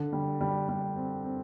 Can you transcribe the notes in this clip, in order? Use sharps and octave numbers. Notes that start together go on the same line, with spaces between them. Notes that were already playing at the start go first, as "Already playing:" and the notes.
Already playing: D3
G3
G3
G3
C4
C4